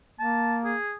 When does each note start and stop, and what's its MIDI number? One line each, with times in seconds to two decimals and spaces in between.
0.20 0.75 58
0.20 0.57 81
0.65 0.96 68